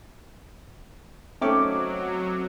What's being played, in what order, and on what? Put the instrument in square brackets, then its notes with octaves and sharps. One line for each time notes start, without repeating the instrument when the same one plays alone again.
[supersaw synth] F#3 [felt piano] A3 C#4 D#4 [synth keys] C4 D6